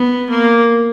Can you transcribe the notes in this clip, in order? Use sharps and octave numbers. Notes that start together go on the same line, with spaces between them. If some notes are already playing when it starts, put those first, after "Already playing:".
Already playing: B3
A#3